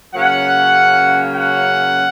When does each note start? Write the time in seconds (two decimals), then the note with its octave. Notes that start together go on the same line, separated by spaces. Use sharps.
0.13 C#3 F#3 A#3 C#4 F#5
1.34 F#5